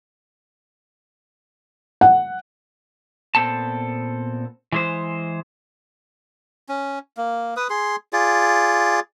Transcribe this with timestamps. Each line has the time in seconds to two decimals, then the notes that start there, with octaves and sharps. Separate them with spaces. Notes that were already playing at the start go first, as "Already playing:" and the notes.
2.01 F#5
3.35 A#2 B3 C4 A4 A5
4.72 E3 G#3 C5
6.69 C#4
7.17 A#3
7.56 B4 D#6
7.70 G#4 C6
8.13 F4 G#4 D5